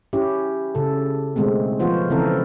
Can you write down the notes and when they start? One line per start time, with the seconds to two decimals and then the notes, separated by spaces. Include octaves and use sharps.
0.13 C#4 E4 G4
0.75 C#3 A4
1.36 B2 D#3 G#3 A3 C4
1.80 F3 F#3 B3 F4 F#4 C5
2.10 C#3 E3 C4 E4 A4 A#4